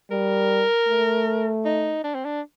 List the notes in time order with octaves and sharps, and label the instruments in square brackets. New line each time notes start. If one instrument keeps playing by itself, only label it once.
[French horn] G3 [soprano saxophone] A#4
[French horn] A3
[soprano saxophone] D#4
D4
C4
D4